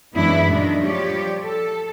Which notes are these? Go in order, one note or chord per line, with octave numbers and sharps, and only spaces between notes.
F#2 E3 G#3 B3 D4 E4
A#2 D#3 D4
F3 G3 G4 C#5 D5
A4